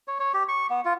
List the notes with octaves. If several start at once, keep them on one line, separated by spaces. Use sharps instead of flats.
C#5
C#5
G4
C#6
B3
F4